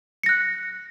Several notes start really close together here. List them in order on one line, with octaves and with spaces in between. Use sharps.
C#7 A#6 F#6